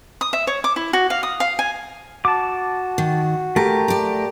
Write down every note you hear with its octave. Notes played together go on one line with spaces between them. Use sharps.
D#6
E5
C#5
D6
E4
F#4
F5
D#6
F5
G#5
F#4 A5 D6
D#3
A3 G4 A#4
G4 D5